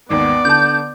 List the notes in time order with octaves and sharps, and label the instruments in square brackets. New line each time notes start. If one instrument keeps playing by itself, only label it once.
[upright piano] G#1 D#2 [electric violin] B3 D5
[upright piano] D3 A5 [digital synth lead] G6